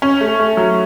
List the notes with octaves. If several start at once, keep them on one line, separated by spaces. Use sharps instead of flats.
C#4
A3
A3
F#3